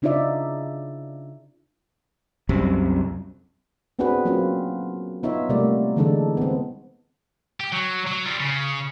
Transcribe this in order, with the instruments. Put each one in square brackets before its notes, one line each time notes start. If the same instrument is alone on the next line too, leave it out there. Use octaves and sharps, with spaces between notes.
[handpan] C#3 D4 D#4 F4 D5 E5
[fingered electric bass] C2 F#2 C3
[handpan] B3 C4 D4 F#4 G#4 B4
F#3 A#3 C4 C#4 F4
B3 D#4 F4 C#5 E5
C3 G3 A3 A#3 D5
D3 E3 G#3 D4 D#4 A4
B3 C4
[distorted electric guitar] G4
F#3
F#3
G3 F4
C#3